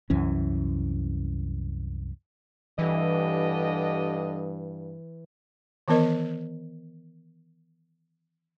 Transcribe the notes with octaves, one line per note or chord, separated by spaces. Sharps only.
C2 F#2 E3 C#4
G2 D3 E3 G4 D#5
D#3 E3 B3 A#4 D#5